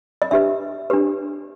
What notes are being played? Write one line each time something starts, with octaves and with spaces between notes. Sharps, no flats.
D#5
D4 G4 B4 E5
D4 G4 B4